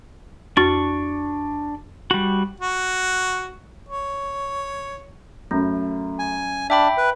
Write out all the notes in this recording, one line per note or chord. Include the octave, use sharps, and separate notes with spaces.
F2 D4 F#4 C#6 A6
G3 F#4
F#4
C#5
F#2 A3
G#5
D4 E5 G5 B5
B4